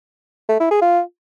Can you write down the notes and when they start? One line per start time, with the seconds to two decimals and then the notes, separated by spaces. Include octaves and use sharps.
0.49 A3
0.60 E4
0.71 G#4
0.82 F4